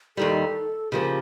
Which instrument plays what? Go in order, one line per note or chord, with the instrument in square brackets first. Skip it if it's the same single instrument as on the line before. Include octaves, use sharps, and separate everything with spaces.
[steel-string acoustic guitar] D#2 D#3 G3 [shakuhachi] A4
[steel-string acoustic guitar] C#3 F3 A#3 [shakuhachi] G4